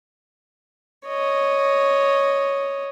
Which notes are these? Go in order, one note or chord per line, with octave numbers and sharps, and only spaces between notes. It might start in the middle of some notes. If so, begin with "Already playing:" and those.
C#5 D#5